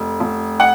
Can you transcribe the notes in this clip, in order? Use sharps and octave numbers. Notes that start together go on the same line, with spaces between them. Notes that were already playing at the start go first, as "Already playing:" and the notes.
Already playing: F1
F1
F#5